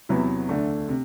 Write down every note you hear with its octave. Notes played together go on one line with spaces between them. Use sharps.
E2 C3 F#3 B3 E4
D2 D3 A3 D4
C3